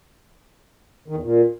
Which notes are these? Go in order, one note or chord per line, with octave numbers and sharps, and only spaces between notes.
D#3
E2
A#2